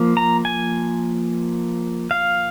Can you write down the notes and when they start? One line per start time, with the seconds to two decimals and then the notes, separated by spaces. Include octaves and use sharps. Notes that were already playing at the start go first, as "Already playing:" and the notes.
Already playing: F3 A#3
0.17 A#5
0.45 G#5
2.11 F5